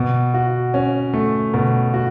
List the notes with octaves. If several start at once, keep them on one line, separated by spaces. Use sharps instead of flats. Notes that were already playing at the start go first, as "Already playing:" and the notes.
Already playing: B2
F#4
C#4
A3
B2
F#4